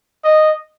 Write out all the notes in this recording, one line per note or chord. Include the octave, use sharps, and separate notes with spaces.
D#5